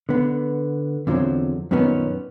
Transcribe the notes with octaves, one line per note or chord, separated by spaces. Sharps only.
D3 B3
E2 D3 F3 F#3 C4
F#2 A#2 D#3 B3 C#4